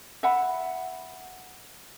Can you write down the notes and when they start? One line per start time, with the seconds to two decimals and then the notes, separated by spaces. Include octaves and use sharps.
0.23 E5 F#5 B5